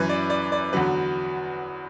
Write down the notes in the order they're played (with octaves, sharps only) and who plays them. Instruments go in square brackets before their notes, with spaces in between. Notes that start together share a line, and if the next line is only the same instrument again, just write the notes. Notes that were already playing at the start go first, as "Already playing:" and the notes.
Already playing: [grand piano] F#2 E3 B4
D5
D5
D5
E2 D3 F#3 B4